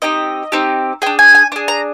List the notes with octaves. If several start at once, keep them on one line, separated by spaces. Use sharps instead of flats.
C4 D#4 G4 D#5
C4 D#4 G4
D4 G#4 G5
G#5
G#5
D4 G#4
A#5